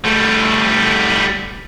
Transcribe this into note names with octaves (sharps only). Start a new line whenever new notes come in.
G3 A3